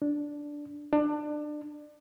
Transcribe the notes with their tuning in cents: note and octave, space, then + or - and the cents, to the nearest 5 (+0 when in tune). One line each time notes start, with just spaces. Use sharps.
D4 -5
D4 +25